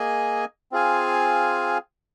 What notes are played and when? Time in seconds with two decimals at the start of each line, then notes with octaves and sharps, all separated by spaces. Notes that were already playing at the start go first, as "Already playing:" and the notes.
Already playing: A#3 G#4 D#5 G#5
0.72 C4 F4 G#4 F5 G#5